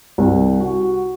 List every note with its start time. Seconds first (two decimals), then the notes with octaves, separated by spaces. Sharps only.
0.18 C2
0.60 F#4